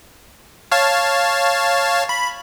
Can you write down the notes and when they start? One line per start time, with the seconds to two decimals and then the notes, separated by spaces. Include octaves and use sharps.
0.72 C#5 F5 A5
2.09 B5